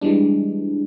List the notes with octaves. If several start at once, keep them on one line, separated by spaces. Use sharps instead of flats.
E3 G3 G#3 D4